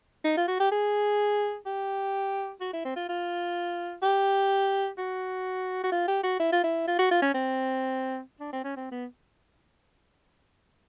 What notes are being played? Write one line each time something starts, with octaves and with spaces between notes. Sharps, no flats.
D#4
F4
F#4
G4
G#4
G4
F#4
E4
C4
F4
F4
G4
F#4
F#4
F4
G4
F#4
E4
F4
E4
F4
F#4
F4
C#4
C4
D4
C4
C#4
C4
B3